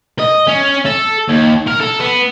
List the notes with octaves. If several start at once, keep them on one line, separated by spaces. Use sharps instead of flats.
D#5
C#4
A4
D#2
A#4
A4
B3